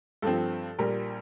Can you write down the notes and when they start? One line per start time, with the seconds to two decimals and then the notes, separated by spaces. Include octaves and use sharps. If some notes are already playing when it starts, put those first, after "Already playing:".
0.22 G2 F3 C4 A4
0.79 A#1 A#2 G3 A#4